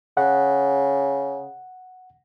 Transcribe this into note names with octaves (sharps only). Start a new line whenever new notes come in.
C#3 F#5